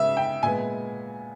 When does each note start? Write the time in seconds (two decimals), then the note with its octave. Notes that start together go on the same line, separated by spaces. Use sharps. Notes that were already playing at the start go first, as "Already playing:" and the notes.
Already playing: C#3 G#3 B3 E5
0.17 G5
0.43 A#2 G#3 B3 G#5